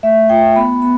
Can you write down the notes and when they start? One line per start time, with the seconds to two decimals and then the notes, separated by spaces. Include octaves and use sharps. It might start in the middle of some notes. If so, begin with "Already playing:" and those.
0.03 A3 E5
0.29 F4 G5
0.56 B3 B5
0.82 B3 B5